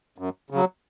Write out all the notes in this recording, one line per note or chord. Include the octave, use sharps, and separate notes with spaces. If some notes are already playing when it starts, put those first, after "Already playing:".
F#2
C#3 F#3